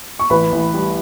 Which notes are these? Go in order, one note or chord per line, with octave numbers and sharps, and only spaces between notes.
C#6
A1 B4 B5
A1
G3